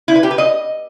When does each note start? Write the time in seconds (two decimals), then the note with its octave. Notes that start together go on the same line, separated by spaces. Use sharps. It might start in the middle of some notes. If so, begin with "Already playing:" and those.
0.08 E4
0.16 B4
0.23 G4
0.31 B4
0.38 D#5